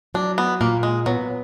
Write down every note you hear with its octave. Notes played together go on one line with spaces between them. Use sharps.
F#3 D4
B3
A#2 A#3
G#3
F#3 B3